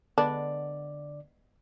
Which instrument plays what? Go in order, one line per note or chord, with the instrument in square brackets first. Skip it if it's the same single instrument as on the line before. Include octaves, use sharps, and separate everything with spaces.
[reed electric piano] D3 D5 [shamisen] G#3 B3 D4